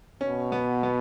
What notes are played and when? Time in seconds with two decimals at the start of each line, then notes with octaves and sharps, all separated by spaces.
0.21 B2 C#4
0.52 B3
0.83 B3